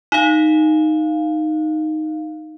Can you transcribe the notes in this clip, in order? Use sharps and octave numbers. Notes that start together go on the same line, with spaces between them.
D#4 F5